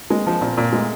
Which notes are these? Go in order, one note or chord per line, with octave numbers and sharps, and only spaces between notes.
G#3 A#3 C4
F3
A#2 A#3 C4
A#2
G#3 A3 B3